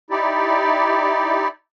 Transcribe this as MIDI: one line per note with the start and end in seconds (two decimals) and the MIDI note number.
0.10 1.48 63
0.10 1.48 64
0.10 1.48 67
0.10 1.48 74